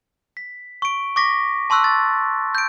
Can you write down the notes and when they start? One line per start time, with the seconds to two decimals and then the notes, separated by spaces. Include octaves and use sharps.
0.37 B6
0.82 C#6 D7
1.16 C#6 D6 A#6 B6
1.70 A5 C6 C#6 E6 F#6
1.84 A6
2.55 G6 D7